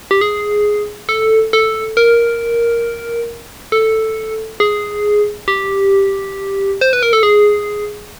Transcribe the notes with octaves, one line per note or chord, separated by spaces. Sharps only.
G4
G#4
A4
A4
A#4
A4
G#4
G4
C5
B4
A#4
A4
G#4